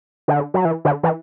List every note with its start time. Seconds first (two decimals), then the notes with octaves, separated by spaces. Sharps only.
0.28 D3
0.54 F#3
0.65 E3
0.85 D3
1.03 E3